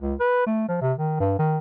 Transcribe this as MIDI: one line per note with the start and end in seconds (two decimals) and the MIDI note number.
0.02 0.14 37
0.20 0.44 71
0.46 0.66 57
0.68 0.80 53
0.81 0.93 48
0.98 1.16 51
1.20 1.34 43
1.39 1.58 51